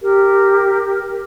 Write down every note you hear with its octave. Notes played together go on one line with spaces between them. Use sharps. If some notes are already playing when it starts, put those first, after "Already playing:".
G4 A#4